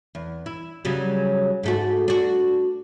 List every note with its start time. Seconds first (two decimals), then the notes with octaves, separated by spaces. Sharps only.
0.15 E2
0.46 E4
0.85 C#3 F#3 G3
1.63 G#2 A3 F#4
2.08 D4 F#4